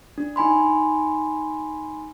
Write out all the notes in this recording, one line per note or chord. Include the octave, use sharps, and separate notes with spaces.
D4
D#4 G#5 B5 C6